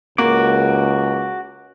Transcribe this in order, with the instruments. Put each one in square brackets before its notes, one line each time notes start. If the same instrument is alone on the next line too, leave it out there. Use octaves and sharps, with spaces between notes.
[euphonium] C#2 [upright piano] A#3 [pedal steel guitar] F#4 D6